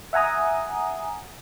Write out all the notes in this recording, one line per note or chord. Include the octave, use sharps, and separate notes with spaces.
E5 F#5 G#5 A#5 D#6